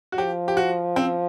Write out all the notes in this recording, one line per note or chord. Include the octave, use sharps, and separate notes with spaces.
F#4
F3 G4
G4
F#4
C4